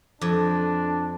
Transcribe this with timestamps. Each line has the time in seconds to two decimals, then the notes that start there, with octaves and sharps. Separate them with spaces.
0.21 F2 D4